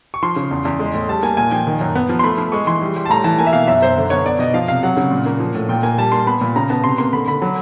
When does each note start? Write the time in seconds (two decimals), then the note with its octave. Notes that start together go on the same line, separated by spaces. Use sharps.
0.14 C#6
0.22 F3 C6
0.36 C#3
0.51 E2
0.65 E2
0.79 G#3
0.94 A2
1.08 G3 A5
1.22 A#3 G#5
1.37 A#2 G#5
1.51 F3 G5
1.67 D#3
1.81 F#2
1.95 B3
2.09 F3
2.19 C6
2.23 A3 B5
2.38 F3
2.52 G#3 C#6
2.67 E3 C6
2.82 G3
2.96 G3
3.06 A5
3.10 A2 A#5
3.24 E3 A5
3.39 A#3 G#5
3.47 E5
3.53 B2 F5
3.67 F#2 E5
3.81 F#2 C5
3.97 D3
4.10 B3 C#5
4.26 B3 D5
4.39 B2 D#5
4.54 F3 F5
4.68 C3 F5
4.83 F#3 F#5
4.97 C#3
5.11 A#2
5.26 A#3
5.40 F3
5.54 A2
5.69 A#2 G5
5.83 A#3 G#5
5.98 G3 A5
6.12 A#3 C6
6.27 B3 B5
6.41 A#2
6.56 C#3 A#5
6.70 B3 A5
6.84 C3 C6
6.98 A#3 C6
7.13 D3 B5
7.28 D3 B5
7.42 F#3